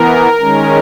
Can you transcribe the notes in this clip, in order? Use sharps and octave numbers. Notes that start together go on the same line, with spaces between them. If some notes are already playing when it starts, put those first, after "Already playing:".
Already playing: E3 B3 A#4
D#3 G#3 C#4